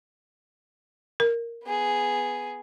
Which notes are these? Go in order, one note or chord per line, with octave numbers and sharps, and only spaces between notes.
A#4
B3 G#4